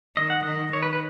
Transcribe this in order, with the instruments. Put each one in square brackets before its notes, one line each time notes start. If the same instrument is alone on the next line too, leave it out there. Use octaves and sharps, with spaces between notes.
[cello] D#3 [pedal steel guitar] D#5
[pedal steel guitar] F#5
[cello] D#3 [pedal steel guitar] D#5
[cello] D#3 [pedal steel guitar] C#5
[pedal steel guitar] B4
B4